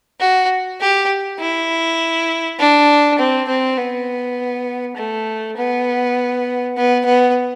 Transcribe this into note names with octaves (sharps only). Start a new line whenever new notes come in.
F#4
G4
E4
D4
C4
C4
B3
A3
B3
B3
B3